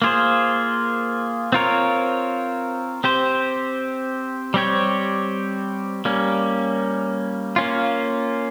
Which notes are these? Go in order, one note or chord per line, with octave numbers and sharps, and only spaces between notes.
A#3 F4 G#4 C5
C4 F4 A#4 C#5
C4 G4 C5
G3 C4 G4 C#5
G3 A#3 C#4
A#3 C#4 F4